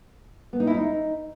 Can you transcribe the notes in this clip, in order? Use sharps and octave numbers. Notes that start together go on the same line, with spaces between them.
B3
D#4
E4
D#4